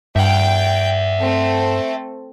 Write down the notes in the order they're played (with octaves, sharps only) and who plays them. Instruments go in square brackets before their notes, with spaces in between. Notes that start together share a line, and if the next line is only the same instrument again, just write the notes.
[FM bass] G2 [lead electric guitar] E5 F#5 [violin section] G5
[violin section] A3 C4 A4